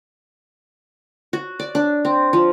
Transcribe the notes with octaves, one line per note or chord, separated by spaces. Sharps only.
F#4
D5
D4
C4
F3